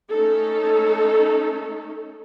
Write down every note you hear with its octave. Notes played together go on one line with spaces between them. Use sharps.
A3 C#4 D#4 A4